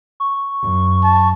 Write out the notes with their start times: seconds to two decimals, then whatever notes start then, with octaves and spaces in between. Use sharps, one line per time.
0.20 C#6
0.62 F#2
1.04 A5